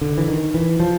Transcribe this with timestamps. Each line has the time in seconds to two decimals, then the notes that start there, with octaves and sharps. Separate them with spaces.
0.01 D3
0.18 E3
0.28 D#3
0.54 E3
0.80 F3